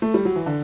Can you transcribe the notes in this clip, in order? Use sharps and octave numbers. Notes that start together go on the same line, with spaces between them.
A3
G3
F#3
E3
D3